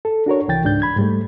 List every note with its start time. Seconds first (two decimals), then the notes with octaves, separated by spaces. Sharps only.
0.05 A4
0.26 D4 F#4 A#4 C#5
0.48 C2 E3 G5 A6
0.64 C#2 G#2 D4 G6
0.82 B5 G#6
0.96 G#2 G3 A3